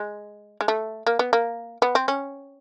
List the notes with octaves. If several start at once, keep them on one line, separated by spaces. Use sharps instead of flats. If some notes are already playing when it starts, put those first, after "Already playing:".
Already playing: G#3
G#3
A3
A#3
B3
A#3
B3
C4
C#4